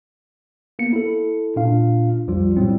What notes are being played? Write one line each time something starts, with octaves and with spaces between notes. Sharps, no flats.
A#3 B3 C#7
E4 A4
A#2 D4 F4 F5
B1 F2 F3 G3 F4
A2 F#3 G3 C4 E4